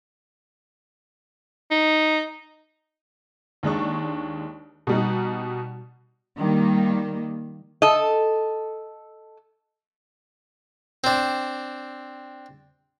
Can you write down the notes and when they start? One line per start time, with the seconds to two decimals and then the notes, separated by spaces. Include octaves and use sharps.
1.71 D#4
3.63 D#2 G#3 D4 C#6
4.87 B2 G3 D#4
6.38 D#3 G3 A#3
7.82 A4 D#5
11.04 C4 D4